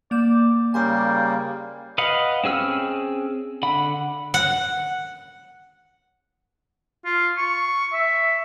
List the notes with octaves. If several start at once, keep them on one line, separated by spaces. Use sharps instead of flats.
A#3 D5 G6 E7
C#3 G3 A#3 G5 G#5 C6 D6
B4 D#5 F5 F#5
C4 C#4 G#4 E6 F6
D3 F#5 B5
F#5
F4
C#6
E5